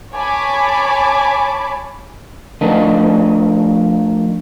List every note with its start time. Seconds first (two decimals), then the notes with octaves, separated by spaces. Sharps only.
0.13 C#5 G#5 A5 B5 D6
2.61 F3 A3 D4 A#4 D#5